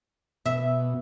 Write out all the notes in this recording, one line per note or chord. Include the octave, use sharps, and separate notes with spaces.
B2 E5